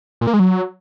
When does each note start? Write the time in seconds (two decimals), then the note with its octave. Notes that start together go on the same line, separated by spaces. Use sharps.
0.21 A#2
0.27 A#3
0.33 G#3
0.40 F#3